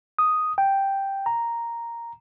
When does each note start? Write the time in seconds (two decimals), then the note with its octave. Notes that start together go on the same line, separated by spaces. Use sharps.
0.19 D#6
0.58 G5
1.26 A#5